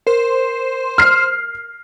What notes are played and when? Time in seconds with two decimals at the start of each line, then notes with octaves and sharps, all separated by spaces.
0.07 A#4 C5
0.98 F6 C7